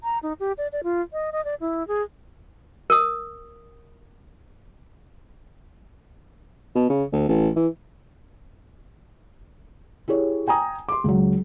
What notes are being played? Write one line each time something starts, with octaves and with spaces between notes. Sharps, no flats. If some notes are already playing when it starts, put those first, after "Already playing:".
A#5
D#4
G4
D5
D5
F4
D#5
D#5
D5
E4
G#4
A#4 D#6
B2
C#3
D2
A1
E3
E4 G4 G#4 C#5
G5 G#5 A#5 D#6
C6 D6
C#2 F#3